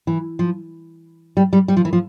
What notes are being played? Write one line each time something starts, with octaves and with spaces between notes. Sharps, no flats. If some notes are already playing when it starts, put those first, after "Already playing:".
E3
F3
G3
G3
G3
F3
E3
F3